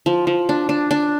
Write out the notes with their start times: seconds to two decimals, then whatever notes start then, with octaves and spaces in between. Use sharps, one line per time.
0.06 F3
0.27 F3
0.49 D4
0.69 D4
0.91 D4